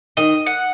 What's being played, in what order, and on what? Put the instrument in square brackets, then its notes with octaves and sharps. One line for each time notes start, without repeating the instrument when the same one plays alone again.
[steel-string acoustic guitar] D#3 [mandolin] D#5
[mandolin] F#5